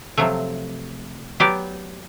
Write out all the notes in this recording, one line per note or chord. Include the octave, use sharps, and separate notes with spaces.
C3 F3 F#3 A3
F#3 B3 G4 D5